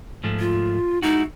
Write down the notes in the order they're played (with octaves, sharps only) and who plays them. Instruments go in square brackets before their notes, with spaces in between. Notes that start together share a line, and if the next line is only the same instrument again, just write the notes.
[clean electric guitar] G#2 F3 A3
[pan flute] F4
[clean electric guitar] G#3 E4 F#4 [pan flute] D#4